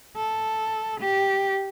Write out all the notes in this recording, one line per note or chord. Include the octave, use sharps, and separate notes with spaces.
A4
G4